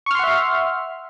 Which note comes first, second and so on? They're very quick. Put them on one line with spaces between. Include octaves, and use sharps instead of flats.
C#6 F6 C6 F#5 E5